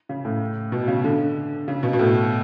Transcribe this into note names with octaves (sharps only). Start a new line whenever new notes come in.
C#3
A2
B2
C#3
D3
C#3
B2
B2
A2